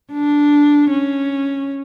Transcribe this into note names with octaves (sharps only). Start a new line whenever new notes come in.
D4
C#4